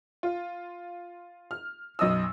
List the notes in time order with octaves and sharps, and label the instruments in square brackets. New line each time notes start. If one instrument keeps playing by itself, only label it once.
[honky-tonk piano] F4
F6
B1 F#2 D#5 D#6 E6